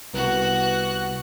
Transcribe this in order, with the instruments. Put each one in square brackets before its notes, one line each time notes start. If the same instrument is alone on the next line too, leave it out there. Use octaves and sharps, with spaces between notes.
[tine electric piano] C2 [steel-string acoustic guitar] B3 [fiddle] F#4 F#6